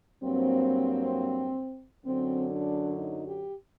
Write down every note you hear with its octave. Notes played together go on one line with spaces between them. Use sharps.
G2 F#3 A#3 C4
F#2 D3 F#3 C4
D4
D#4
G4